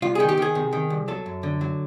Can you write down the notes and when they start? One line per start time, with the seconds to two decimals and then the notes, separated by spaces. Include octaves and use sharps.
0.02 C2 F4
0.15 D#3 G#4
0.29 G4
0.37 D#3 G#4
0.55 C3
0.73 D#3
0.90 C2
1.08 F#3 A4
1.26 F#2
1.43 D3
1.61 F#3